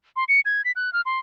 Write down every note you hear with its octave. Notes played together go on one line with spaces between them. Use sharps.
C6
C#7
G#6
B6
F#6
F6
C6